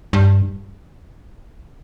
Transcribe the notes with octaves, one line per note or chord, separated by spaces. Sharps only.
G2